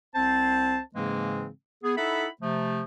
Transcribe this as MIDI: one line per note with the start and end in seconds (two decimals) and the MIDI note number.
0.15 0.80 36
0.15 0.80 60
0.15 0.80 72
0.15 0.80 81
0.95 1.49 44
0.95 1.49 49
0.95 1.49 52
0.95 1.49 56
0.95 1.49 58
0.95 1.49 60
1.84 1.95 59
1.84 1.95 68
1.97 2.28 63
1.97 2.28 64
1.97 2.28 69
1.97 2.28 76
1.97 2.28 78
1.97 2.28 83
2.41 2.83 48
2.41 2.83 53
2.41 2.83 57